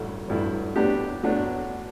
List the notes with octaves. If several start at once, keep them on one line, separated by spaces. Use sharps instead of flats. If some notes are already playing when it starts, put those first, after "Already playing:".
Already playing: A1 G2 F#3 A3 E4
A1 G2 F#3 A3 E4
A2 F#3 B3 D4 G4
A2 F#3 B3 D4